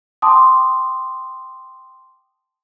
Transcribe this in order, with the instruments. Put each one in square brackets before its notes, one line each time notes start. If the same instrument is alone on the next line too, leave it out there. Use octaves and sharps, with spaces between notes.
[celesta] G5 A5 C6 D6 D#6